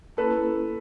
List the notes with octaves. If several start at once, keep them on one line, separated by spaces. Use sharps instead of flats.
A#3 C#4 E4 A4 B4